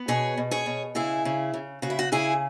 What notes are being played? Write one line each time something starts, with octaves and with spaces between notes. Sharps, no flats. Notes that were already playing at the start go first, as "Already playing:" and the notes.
Already playing: B3
B2 G#4 C#5
B2
G#4 C#5
B2
C#3 E4 G#4
C#3
C#3
C#3 F#4
E4
F#4
C#3 E4 G#4